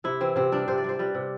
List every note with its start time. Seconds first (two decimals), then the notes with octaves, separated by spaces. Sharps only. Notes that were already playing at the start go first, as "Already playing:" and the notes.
0.04 C3 E4
0.21 E3 C4
0.36 C3 C4
0.52 G3 D4
0.68 C3 C5
0.78 D5
0.84 G3 C5
0.99 G3 B4
1.15 C3